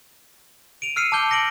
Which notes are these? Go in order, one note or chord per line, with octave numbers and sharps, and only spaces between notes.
D7 D#7 F7
E6 F6 C7 C#7 D#7
A5 D6 F6 G6 G7
G6 A#6 C#7 D7 F#7